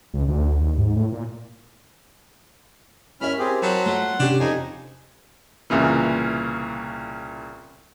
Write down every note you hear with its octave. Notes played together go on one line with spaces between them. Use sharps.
C#2
D2
D#2
G#2
A2
A#2
C#4 E4 A#4 E5 B5 F6
C4 G4 G#4
F#3 C5 A5 B5
A3 F4 F#5 C6
C3 C#4 D4 G4
F2 D#4 G#5
C2 A#2 C#3 E3